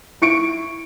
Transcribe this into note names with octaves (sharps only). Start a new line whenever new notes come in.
E4 C#6 C#7 D7